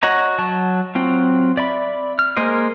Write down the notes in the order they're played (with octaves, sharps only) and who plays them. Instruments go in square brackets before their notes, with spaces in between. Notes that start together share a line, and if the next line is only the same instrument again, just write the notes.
[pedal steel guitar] F#4 C#5 D#5 A#5
F#3 A5
F#3 C4 F4
D5 E5 B5
F6
G#3 A#3 A#4 C5 D#5